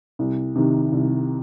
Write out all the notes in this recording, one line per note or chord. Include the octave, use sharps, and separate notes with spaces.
C2
C3 D#3
C2